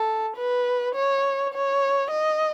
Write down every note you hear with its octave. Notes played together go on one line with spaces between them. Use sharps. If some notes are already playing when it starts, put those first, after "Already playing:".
Already playing: A4
B4
C#5
C#5
D#5